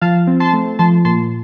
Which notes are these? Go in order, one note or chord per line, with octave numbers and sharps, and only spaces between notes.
F3 F5 A5
C4
A5 C6
A3
F3 A5 C6
A#2 A5 C6